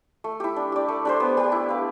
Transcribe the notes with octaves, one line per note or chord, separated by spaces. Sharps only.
A3
E4 G4
D4
G4 D5
A3
D4 G4 C5
B3
D4 G4
E4
B4 F5